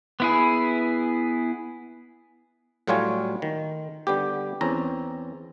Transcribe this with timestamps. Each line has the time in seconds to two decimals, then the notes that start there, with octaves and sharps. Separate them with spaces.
0.20 B3 E4 G#4
2.87 A2 F#3 G3 F4 C#5 G#5
3.42 D#3
4.07 D3 G3 B3 G4
4.61 E2 C4 C#4 A#5